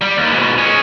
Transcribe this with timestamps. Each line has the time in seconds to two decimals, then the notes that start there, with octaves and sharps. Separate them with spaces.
0.01 G3
0.17 D#2
0.33 G#2 B2
0.58 G#3 C#4